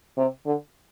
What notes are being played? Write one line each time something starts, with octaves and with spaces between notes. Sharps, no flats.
C3
D3